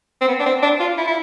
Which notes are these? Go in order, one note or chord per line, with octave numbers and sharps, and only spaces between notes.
C4
B3
D4
C4
D4
F4
E4
E4